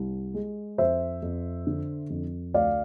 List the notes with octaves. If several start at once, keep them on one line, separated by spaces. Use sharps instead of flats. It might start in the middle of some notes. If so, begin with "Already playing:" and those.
Already playing: C2
G#3
F2 C5 E5
F2
D3
F2
D2 D5 F5